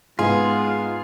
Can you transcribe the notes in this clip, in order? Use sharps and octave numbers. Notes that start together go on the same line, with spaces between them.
G#2 G#3 B3 F4 G#4 B4